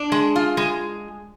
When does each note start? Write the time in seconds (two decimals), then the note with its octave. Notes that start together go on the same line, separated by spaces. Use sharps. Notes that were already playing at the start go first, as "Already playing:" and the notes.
Already playing: D4
0.12 G#3
0.36 F4
0.57 G#3